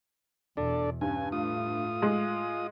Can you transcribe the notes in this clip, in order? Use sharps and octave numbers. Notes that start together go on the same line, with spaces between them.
E2 B2 D4 A4 D5
G2 C#4 G#5
A2 A3 F4 D#6
G#3